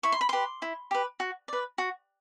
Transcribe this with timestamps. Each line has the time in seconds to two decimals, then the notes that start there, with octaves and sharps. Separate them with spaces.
0.03 E4 C#6
0.12 C6
0.21 B5
0.29 G4 B4 C6
0.62 E4
0.91 G4 B4
1.20 F#4
1.48 B4 D5
1.78 F#4